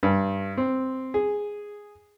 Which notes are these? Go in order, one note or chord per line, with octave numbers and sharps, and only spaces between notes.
G2
C4
G#4